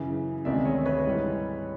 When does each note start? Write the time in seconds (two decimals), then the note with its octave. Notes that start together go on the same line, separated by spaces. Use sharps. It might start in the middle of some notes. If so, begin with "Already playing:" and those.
Already playing: F#2 C#3 E3
0.45 D2 C3 D#3 G#3 D5 E5
0.65 C#5 D#5
0.86 B4 C#5
1.05 G#2 E3 G3